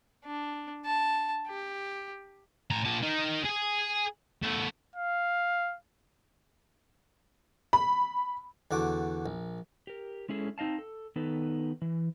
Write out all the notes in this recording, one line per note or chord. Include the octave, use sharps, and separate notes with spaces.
D4
A5
G4
A2 A#5
A#2 A5
D#4 A#4
G#4 G#5
A3 B3
F5
B5
E2 D3 F#4 D6
A#1
G4 A#4
G#3 C#4 E4 G#4 A4
C4 D#4 D#5 F5 A5
A4
D#3 B3 D#4 A4 B4
E3